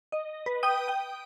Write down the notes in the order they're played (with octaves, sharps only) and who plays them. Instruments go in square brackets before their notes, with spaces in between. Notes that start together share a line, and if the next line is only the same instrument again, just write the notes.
[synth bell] D#5
B4
G5 D#6 D#7
G5